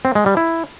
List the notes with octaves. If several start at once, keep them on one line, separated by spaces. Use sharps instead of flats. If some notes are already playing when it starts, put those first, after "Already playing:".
C4
G#3
G3
E4